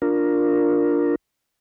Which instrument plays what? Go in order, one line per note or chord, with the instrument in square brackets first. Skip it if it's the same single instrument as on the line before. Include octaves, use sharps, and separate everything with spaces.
[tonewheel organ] D4 F4 A#4